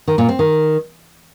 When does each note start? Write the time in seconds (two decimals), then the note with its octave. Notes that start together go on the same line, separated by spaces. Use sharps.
0.08 D#3
0.18 A#2
0.29 C4
0.39 D#3